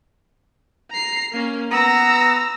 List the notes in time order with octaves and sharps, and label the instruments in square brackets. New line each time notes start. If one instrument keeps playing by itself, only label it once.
[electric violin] A#5 C7
A#3 C#4
[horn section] B3 A#5 [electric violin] E6 A#6